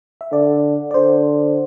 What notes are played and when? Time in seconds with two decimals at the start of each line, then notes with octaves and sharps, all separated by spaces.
0.21 E5
0.32 D3 D5
0.91 D5
0.94 D3 C5